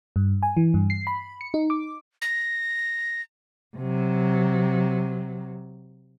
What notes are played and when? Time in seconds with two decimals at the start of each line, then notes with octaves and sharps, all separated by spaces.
0.16 G2
0.43 G#5
0.57 E3
0.74 G2
0.90 C7
1.07 B5
1.41 C#7
1.54 D#4
1.70 D6
2.22 A#6
3.77 C3 F#3